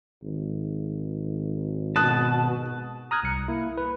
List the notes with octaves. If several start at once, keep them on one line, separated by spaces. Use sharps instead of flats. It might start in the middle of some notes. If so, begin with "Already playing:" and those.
G#1
B2 A5 D#6 F#6
A#5 D#6 F6 F#6 G#6
C2 C#7
A#3 E4
B4